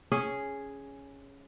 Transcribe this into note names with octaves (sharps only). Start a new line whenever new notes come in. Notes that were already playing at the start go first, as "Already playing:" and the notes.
C#4 G#4